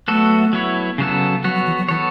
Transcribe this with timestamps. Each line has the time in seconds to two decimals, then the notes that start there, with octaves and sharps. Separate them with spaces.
0.08 F#3 A3 B3 F#4 A4
0.53 F#3 B3 E4 C#5
0.98 C#3 F#3 B3 A4
1.44 F#3 B3 F#4 C#5
1.55 F#3
1.66 E3
1.78 F#3
1.89 E3 B3 A4 C#5